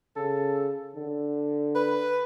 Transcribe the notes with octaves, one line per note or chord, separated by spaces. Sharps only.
C#3 A4
D3
B4